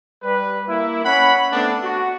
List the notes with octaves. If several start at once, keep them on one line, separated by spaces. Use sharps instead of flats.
G3 B4
A#3 E4
C#4 F#5 B5
A3 B3 C4 D4
F#4